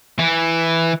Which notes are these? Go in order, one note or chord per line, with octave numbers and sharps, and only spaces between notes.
E3